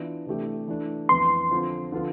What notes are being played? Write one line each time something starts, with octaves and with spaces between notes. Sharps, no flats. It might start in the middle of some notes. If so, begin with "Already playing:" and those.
Already playing: E3 B3 D4 F4
C3 E3 A3 D4 G4
E3 A3 D4
F2 E3 B3 C6
D3 F3 C4 F4
D3 F3 B3 F4